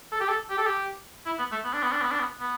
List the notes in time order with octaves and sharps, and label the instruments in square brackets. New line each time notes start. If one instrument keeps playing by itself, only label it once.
[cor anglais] A4
G4
A4
G4
A4
G4
E4
B3
A3
B3
D4
B3
D4
B3
D4
B3
B3